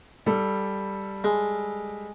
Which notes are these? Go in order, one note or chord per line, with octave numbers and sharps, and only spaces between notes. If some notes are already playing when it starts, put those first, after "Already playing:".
G3 A4
G#3